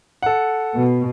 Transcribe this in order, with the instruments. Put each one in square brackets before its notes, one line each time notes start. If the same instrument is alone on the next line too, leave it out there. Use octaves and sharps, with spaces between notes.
[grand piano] A4 F#5
[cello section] B2